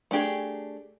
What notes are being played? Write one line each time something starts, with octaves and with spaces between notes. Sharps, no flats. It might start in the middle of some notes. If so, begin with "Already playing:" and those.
A3 D4 G4 G#4